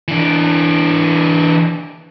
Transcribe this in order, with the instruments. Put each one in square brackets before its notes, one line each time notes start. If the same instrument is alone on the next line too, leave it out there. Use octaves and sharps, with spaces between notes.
[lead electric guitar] E3 D4